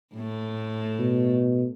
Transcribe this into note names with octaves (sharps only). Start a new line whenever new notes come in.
A2 A3
B2